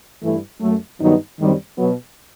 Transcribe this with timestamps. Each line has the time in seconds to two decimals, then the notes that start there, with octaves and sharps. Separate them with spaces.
0.23 G2 E3 A3 E4
0.61 F#2 F#3 A3
1.00 G2 D#3 F#3 B3 D#4
1.39 F#2 D#3 G3 C4
1.78 B2 F#3 B3 F#4